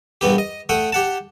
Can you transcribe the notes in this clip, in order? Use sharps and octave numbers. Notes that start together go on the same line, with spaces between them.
A#1 G2 B3 G4
D#5
A3 F#5 G5 D#6
G4 F#5 A5